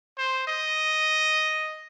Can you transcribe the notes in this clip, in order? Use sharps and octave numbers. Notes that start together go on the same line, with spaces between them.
C5
D#5